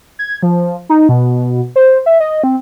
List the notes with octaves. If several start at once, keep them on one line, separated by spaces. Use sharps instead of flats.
G#6
F3
D#4
B2
C5
E5
D#5
C4